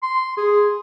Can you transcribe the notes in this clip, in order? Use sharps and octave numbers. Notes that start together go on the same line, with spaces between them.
C6
G#4